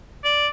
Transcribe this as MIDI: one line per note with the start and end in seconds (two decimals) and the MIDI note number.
0.24 0.48 74